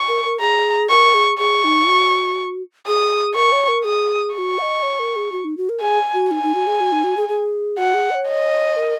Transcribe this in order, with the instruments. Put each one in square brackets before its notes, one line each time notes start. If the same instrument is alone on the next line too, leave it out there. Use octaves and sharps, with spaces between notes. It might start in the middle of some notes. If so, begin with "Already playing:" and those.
Already playing: [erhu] C#6
[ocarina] A#4
A#4
[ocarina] G#4 [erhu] A#5
[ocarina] A#4 [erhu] C#6
[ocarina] G#4
[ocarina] G#4 [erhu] C#6
[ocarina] D#4
F#4
[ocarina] G#4 [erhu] D#6
[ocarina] A#4 [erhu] C#6
[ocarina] C#5
A#4
[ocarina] G#4 [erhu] D#6
[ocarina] F#4 G#4 [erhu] C#6
[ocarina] F#5
D#5
C#5
A#4
G#4
F#4
D#4
F#4
A#4
[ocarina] G#4 [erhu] G#5
[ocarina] F#4
[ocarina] D#4 [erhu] G#5
[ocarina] D#4
F#4
G#4
F#4
D#4
F#4
G#4
G#4
[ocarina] F#4 [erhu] F#5
[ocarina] G#4
D#5
C#5
[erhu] D#5
[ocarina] A#4